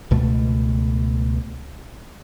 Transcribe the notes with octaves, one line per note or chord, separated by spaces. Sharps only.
C#2 B2 A3